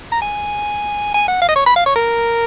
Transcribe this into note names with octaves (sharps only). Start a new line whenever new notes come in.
A#5
G#5
G#5
F#5
F5
D#5
C#5
B5
F5
C#5
A#4